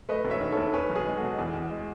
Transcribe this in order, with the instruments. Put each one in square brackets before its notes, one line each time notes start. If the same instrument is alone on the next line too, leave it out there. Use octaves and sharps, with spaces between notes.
[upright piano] A3 B4 D#5
E1
C#5 E5
D#3
D#2 A4 C#5
C#4 G#4 B4
B1
G#4 B4
G#3
F#4 A4
B2
E2 G#4
E2
G#3